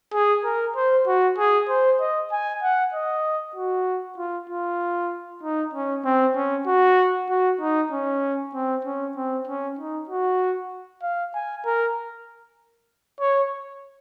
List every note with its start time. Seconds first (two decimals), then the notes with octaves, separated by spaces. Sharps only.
0.13 G#4
0.44 A#4
0.76 C5
1.07 F#4
1.38 G#4
1.69 C5
2.00 D#5
2.32 G#5
2.63 F#5
2.94 D#5
3.55 F#4
4.18 F4
4.49 F4
5.43 D#4
5.74 C#4
6.05 C4
6.35 C#4
6.66 F#4
7.29 F#4
7.61 D#4
7.92 C#4
8.54 C4
8.84 C#4
9.16 C4
9.47 C#4
9.79 D#4
10.09 F#4
11.02 F5
11.34 G#5
11.65 A#4
13.20 C#5